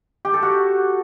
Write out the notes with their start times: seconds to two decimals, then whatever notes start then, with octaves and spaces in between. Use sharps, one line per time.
0.25 G4
0.34 A4
0.43 F#4